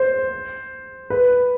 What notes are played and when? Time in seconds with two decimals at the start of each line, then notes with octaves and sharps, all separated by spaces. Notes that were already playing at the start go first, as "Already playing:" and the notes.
Already playing: C5
1.10 B4